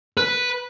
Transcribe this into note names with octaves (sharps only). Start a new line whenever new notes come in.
B4